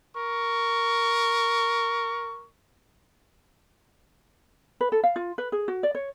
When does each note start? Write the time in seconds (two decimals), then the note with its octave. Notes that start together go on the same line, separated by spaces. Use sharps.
0.17 A#4 C#6
4.81 B4
4.92 A4
5.04 F5
5.16 F4
5.38 B4
5.52 G#4
5.68 F#4
5.83 D5
5.95 C#5